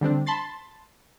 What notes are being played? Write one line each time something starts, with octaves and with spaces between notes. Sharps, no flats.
D3 G3 C4 D4
A5 B5 C6 A6